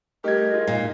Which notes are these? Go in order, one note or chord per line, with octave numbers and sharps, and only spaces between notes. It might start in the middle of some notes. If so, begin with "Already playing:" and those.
G3 A3 G4 A#4 D#5 G#6
F4 G#4
A#2 D#4 F5